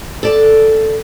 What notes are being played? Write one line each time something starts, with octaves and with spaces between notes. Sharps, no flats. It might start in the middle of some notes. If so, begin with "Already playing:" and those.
A4 D5 A5